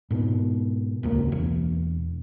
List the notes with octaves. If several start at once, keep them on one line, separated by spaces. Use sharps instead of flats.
G#2 B2
D#1 C#2 A#3
E1